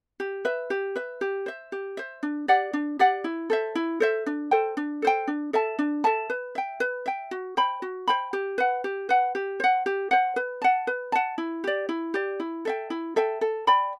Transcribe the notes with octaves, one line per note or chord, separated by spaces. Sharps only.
G4
B4 E5
G4
B4 E5
G4
C5 E5
G4
C5 E5
D4
G4 D5 F#5
D4
G4 D5 F#5
E4
A4 C5 E5
E4
A4 C5 E5
D4
A4 C5 G5
D4
A4 C5 G5
D4
A4 E5 A5
D4
A4 E5 A5
B4
E5 G5
B4
E5 G5
F#4
C5 G5 B5
F#4
C5 G5 B5
G4
B4 F#5
G4
B4 F#5
G4
C5 F#5
G4
C5 F#5
B4
F#5 A5
B4
F#5 A5
E4
G4 D5
E4
G4 D5
E4
A4 E5 G5
E4
A4 E5 G5
A4
D5 G5 B5